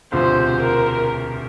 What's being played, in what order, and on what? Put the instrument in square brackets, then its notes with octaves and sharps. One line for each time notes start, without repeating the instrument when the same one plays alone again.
[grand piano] E1 D2 C3 F3 [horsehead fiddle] C5
[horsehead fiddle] A#4